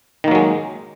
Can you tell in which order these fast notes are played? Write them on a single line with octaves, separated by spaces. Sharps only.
D#3 A#3 F#3 G#3